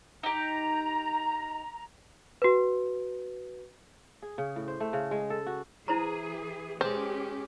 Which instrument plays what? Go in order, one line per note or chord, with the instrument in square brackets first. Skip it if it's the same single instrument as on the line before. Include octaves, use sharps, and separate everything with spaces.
[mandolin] D#4 G4 [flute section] A#5
[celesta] F#4 B4
[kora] G#4
C#3
A2
C5
A3
C#3
G#3
A4
F#4
[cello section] E3 G#4 [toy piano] E4 C5 A#5
[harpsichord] G#3 A5 [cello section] C#4 G4 [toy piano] B4 [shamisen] C5